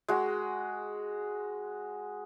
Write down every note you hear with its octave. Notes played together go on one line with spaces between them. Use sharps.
G#3 F#4